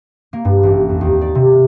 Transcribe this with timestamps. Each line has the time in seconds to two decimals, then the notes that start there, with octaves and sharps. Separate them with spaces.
0.33 A#3
0.45 G2
0.63 A1
0.89 F2
1.01 D#2
1.21 D5
1.35 C3